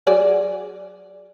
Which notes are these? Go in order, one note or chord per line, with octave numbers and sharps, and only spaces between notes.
F#3 G#4 D5